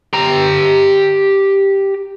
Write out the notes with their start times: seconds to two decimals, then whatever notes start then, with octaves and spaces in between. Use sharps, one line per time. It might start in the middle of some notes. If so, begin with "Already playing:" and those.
0.13 G4 A#5